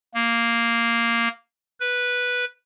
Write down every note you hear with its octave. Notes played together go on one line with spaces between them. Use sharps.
A#3
B4